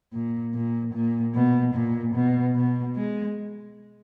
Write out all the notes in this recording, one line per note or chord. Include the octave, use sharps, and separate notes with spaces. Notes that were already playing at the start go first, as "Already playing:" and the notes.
A#2
A#2
A#2
B2
A#2
B2
B2
G#3